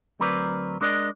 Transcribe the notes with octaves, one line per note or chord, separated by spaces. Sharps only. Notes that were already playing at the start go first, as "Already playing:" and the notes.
D2 F#3 C4 A#4 B4 D5
G#3 D4 A#4 D5 D#5